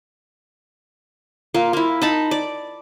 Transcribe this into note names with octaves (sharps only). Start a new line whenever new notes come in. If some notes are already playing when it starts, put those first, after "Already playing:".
A#3 F4
A#3 E4
D#4 A5 B5
D5